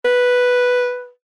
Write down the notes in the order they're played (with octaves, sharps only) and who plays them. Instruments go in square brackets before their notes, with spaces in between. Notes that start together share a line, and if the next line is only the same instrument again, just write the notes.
[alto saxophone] B4